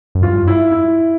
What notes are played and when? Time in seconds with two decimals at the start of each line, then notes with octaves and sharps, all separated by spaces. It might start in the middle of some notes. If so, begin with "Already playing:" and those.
0.15 F#2
0.22 G2 F4
0.47 E4
0.72 E4